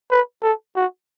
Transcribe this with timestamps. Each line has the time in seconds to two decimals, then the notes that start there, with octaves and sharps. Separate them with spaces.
0.11 B4
0.42 A4
0.76 F#4